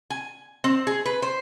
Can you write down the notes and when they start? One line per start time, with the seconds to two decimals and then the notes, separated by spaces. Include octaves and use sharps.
0.10 G#5
0.64 C4
0.87 G#4
1.06 B4
1.22 C5